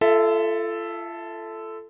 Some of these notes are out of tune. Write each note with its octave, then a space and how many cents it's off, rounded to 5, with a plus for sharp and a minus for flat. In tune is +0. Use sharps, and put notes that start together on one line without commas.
F4 -35 A4 +0 E5 +0